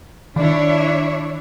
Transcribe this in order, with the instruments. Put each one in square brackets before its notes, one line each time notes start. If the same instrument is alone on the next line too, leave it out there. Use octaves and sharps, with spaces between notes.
[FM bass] D#3 [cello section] D4 E4 C#5